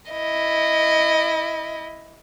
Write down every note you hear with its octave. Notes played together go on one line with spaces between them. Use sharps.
E4 D#5